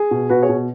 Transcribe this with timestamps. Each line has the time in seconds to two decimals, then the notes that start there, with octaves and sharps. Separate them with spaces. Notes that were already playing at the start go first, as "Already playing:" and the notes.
Already playing: G#4
0.11 B2
0.29 B2 F#4 B4
0.42 G#4 C#5
0.49 B2